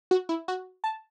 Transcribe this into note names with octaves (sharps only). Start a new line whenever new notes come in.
F#4
E4
F#4
A5